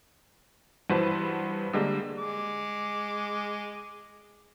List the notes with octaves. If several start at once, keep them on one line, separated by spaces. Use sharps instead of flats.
G2 E3 F#4 B4 C5 A5
D3 G3 G#3 A#3
G#3 D6